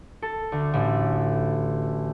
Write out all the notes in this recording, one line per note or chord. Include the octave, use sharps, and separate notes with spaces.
A4
D2
A1